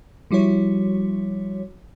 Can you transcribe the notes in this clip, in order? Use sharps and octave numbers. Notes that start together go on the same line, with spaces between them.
F3 G3 E4 F#4 C#5